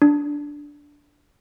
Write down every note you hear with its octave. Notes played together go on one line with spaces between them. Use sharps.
D4